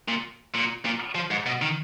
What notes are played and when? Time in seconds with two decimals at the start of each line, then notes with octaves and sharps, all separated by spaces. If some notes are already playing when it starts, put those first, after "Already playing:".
0.08 A#2
0.54 A#2
0.85 A#2
1.15 F3
1.31 G#2
1.46 B2
1.62 D#3